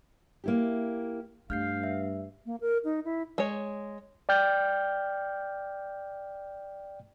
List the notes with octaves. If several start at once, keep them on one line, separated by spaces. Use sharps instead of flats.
A#3 E4 G4
G2 A3 F5 F6 G6 C7
E5
A#3
A#4
D#4
E4
G#3 C#5
D5 G5 F6 G6